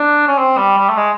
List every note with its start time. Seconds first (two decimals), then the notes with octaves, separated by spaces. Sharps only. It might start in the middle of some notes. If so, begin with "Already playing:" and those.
Already playing: D4
0.28 C#4
0.39 C4
0.57 G3
0.78 G3
0.89 A3
0.97 G#3